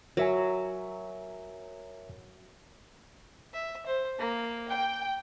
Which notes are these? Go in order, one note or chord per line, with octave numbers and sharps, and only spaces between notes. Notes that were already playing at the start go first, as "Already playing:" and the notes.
F#3 A#4 E5 G#5
E5
C5
A#3
G5